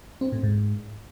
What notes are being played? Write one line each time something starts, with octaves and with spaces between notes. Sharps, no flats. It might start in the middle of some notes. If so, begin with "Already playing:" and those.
C4
A2
G#2